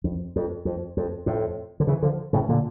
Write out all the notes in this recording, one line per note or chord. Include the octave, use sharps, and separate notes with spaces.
F2
F2
F2
F2
F2 A2
D3
C#3 E3
D3 F3
A2 C#3
A#2 D3